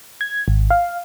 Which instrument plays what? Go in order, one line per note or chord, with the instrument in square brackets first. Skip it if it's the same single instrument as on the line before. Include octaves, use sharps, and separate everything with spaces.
[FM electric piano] G#6
G#1
F5